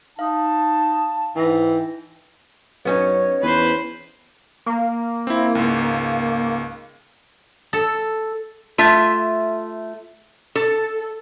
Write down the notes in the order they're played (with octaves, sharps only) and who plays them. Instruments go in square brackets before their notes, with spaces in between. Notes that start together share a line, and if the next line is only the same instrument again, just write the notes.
[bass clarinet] D#4 [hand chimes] F5 [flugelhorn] A5
[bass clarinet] G#2 [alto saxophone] E3 [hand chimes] D#4 A#6 [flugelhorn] G5
[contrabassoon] F#2 [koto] B3 C#4 D#4 [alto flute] C#5
[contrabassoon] E2 [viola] B4 C5
[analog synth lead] A#3
[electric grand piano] C4 E4
C#2 G#2
[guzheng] A4
[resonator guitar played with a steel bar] A3 F4 E5
A4